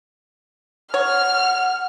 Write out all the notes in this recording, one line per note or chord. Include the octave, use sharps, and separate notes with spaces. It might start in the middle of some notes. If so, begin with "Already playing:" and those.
C#5 F#5 F6